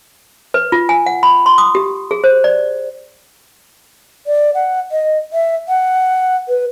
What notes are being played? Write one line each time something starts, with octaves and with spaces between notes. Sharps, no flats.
B4
F4
G#5
F#5
B5
C6
D#6
G4
G#4
C5
D5
D5
F#5
D#5
E5
F#5
B4